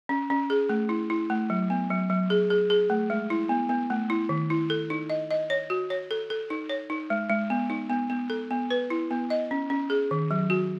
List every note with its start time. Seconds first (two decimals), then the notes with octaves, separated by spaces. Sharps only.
0.09 C#4
0.30 C#4
0.50 G#4
0.69 A3
0.89 E4
1.10 E4
1.30 A3
1.50 F#3
1.70 B3
1.90 F#3
2.10 F#3
2.30 G#4
2.50 G#4
2.70 G#4
2.90 A3
3.10 G#3
3.30 E4
3.49 B3
3.69 B3
3.90 A3
4.10 E4
4.29 D#3
4.50 E4
4.70 A4
4.90 D#4
5.10 D#5
5.31 D#5
5.50 C#5
5.70 F#4
5.90 C#5
6.11 A4
6.30 A4
6.50 D#4
6.70 C#5
6.90 D#4
7.10 G#3
7.30 G#3
7.50 B3
7.70 D#4
7.90 B3
8.10 B3
8.30 A4
8.51 B3
8.70 B4
8.90 E4
9.11 B3
9.30 D#5
9.51 C#4
9.70 C#4
9.90 G#4
10.11 D#3
10.31 F#3
10.50 F#4